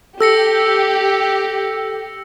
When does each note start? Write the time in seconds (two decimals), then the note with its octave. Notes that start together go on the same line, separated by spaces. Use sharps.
0.21 G4 A4 E6 A#6 C#7